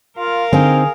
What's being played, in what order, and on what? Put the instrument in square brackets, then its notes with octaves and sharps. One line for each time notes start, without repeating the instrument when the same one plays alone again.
[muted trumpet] F4 [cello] A#4 F5
[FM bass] D3 [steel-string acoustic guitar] C4 D#4 [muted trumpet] G#4